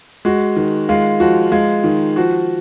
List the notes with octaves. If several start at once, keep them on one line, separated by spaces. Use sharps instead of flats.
G#3 F#4
D#3
G#3 F4
F3 F#4
G#3 F4
D#3
F3 F#4